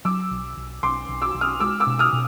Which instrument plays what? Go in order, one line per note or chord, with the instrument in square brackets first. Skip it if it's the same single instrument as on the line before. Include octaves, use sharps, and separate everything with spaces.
[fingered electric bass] F#3 [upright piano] D6 E6
[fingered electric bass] B1
B1
[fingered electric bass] B1 [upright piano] C6 D6
[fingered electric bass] B1
[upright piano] D6 E6
[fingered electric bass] B1
[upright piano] D#6 F6
[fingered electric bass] G#3 [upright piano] D6 E6
[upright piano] D6 E6
[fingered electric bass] B2
[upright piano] D#6 F6
[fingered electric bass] B2